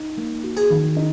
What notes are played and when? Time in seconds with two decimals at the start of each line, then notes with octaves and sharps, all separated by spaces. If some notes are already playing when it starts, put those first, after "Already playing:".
Already playing: D#4
0.17 A#3
0.44 F#4
0.57 G#4
0.70 D#3
0.97 D#4